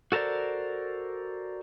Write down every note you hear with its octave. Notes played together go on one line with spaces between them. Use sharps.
F#4 A4 A#4 C5 D5